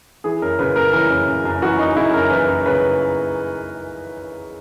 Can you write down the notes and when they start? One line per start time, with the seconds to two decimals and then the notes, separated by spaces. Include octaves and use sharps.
0.24 E3 G#4
0.42 F#2 A#4
0.59 C#3 B4
0.76 F#2 A#4
0.93 E3 A#4
1.10 F#2
1.28 C#3
1.45 F#2
1.62 E3 F#4
1.79 F#2 D#4
1.96 C#3 E4
2.13 F#2 A#4
2.30 E3 B4
2.48 F#2
2.66 C#3 B4